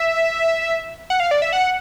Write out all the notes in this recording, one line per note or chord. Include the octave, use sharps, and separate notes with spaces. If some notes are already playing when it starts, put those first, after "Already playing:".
Already playing: E5
F#5
F5
D5
E5
F#5